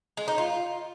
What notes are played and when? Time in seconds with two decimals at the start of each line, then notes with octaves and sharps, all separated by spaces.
0.17 G#3
0.28 D#4
0.38 F4